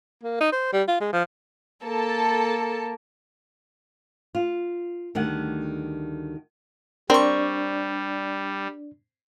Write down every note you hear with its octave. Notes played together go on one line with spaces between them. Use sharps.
A#3
D#4
C5
G3
F4
G#3
F3
A#3 A4 A5
F4
D2 D#3 G3 F#5
G3 C4 D4 A#4 D5 C#6